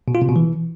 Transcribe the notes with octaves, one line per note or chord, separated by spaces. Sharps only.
B2
F4
C3
B2
E3